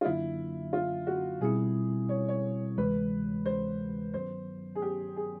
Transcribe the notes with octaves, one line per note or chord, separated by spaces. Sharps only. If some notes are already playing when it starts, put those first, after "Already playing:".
F4
F#2 D3 F#3 A#3 D4 E4
F4
F#4
B2 G3 C4 E4 G#4
C#5
C#5
D2 C3 E3 G#3 B4
C5
G2 D#3 F#3 B3 C5
G#4
G4
G#4